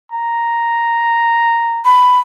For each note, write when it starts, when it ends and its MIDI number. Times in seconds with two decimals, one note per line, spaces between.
0.12 1.81 82
1.85 2.19 83